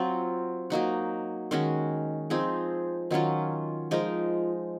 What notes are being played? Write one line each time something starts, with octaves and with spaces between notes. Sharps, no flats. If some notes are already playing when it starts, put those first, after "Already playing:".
Already playing: F#3 C4 F4
F#3 A#3 D#4 F#4
D#3 G#3 C#4 F#4
F3 C4 D#4 G#4
D#3 F#3 C#4 F4
F3 G#3 D#4 A#4